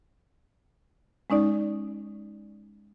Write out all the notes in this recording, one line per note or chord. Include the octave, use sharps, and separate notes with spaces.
G#3 C#4 D#4 D5